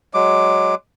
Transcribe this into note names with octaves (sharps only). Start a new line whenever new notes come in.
F#3 G#3 D6